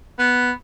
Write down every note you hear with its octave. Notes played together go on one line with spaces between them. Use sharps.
B3